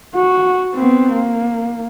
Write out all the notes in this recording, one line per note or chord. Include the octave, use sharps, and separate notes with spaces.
F#4
B3 C4
A#3